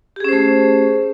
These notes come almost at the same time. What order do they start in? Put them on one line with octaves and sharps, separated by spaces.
G4 G#4 C#4 C5 A3